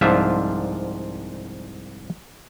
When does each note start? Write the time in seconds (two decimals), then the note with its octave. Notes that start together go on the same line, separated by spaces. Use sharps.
0.01 C2 G#2 F3 D4 F4 E5